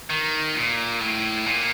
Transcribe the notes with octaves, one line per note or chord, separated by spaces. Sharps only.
D#3
A#2
A2
A#2